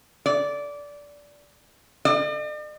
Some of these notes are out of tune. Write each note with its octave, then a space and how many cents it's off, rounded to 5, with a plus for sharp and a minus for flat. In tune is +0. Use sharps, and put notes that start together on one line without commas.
D5 -15
D5 +45